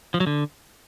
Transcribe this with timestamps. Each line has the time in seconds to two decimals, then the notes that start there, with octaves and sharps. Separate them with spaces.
0.14 F3
0.20 F#3
0.27 D3